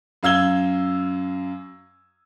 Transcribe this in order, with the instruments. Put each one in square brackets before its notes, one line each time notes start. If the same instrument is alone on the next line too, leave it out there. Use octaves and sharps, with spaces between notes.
[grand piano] F#2 F5 E6 G#6 G7